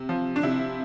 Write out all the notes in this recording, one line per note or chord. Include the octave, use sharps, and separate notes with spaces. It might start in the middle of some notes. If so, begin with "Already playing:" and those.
Already playing: C3
F3
D4
C3 E4